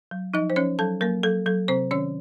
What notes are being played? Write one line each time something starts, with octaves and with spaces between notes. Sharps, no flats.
F#3
F3 D#4 D#5
C5
F3 C#4 C#5
F#3 A4 A5
F#3 A#3 A#4
F#3 A4
F#3 A4
C3 C4 C5
D#3 C#4 C#5